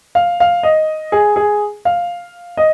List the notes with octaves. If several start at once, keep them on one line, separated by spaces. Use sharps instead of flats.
F5
F5
D#5
G#4
G#4
F5
D#5